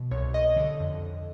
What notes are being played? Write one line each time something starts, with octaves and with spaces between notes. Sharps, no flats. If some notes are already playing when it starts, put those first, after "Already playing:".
Already playing: B2
C2 C#5
C2 D#5
D3
F2
F2